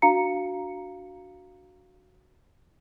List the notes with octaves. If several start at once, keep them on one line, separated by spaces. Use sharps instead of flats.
D4 F#4 F5 A#5 C#7